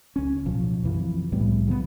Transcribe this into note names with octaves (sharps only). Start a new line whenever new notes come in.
C#2 C#4
D1 B1 F3
F#2 C3 E3 F3
C2 A2 G3 B3
C#3 F3 A#3 B3